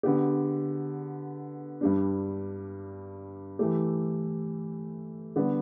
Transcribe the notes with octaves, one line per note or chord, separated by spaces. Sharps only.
D3 B3 G4
G2 G3 D4
E3 A3 G4
D3 G3 B3 G4